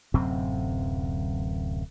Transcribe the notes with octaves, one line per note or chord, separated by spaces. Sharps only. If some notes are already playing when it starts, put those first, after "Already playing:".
D1 F#2 C3 C4